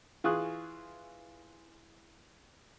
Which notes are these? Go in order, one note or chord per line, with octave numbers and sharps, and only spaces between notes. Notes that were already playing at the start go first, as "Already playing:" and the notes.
E3 F4 G#4 C#6 D#6 F#6